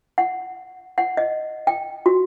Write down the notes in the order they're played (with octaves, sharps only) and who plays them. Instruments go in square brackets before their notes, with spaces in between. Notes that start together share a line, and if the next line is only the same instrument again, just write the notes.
[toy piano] F#5
F#5
D#5
G5
F#4